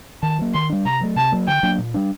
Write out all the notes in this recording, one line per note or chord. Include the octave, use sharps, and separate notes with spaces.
D#3 A5
F#3 A#3
D#3 C6
G3 D4
C3 A#5
F#3 A3
C3 A5
F#3 A#3
D3 G5
F#3 A#3 D4
A#2
G3 D4